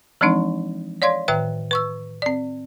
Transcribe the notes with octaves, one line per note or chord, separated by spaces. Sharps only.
E3 F3 G#3 C4 D4 D#4
C#5 D5 F5 C6 G#6
A2 D#3 B4 E5 G5 F#6
B4 C#6 E6
C4 D5